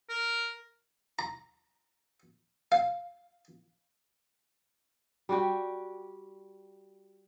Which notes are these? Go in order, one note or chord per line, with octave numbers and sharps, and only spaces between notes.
A#4
A#5
F5
G3 F#4 G4